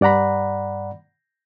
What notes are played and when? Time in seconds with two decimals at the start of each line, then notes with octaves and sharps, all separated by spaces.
0.01 G2 D5 F#5 A#5 B5